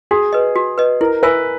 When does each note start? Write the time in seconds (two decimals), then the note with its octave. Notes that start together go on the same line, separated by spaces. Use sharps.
0.11 F#4 G#4
0.33 B4 D#5
0.56 F#4
0.78 B4 D#5
1.01 E4 A#4
1.23 A#4 B4 E5 G#5